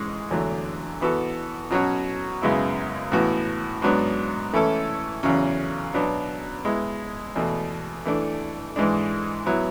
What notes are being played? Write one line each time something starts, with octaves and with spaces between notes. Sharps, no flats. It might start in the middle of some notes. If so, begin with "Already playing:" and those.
Already playing: G#2 E3 G#3 C#4 G#4
E2 D3 F#3 A3
E3 B3 F#4 A4
B2 F#3 C#4 F#4 C#5
F#2 C#3 G#3 B3 E4
A2 E3 B3 F#4
G#2 F#3 B3 D4
E3 A3 C#4 E4 A4
E2 C#3 F#3 C#4
B2 F#3 B3 D4
G#3 B3 E4
E2 B2 A3
E3 A3 D4
G#2 E3 G#3 D4
F#3 B3 E4